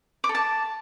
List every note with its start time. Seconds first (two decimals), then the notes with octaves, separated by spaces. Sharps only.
0.24 D6
0.29 A4
0.35 A5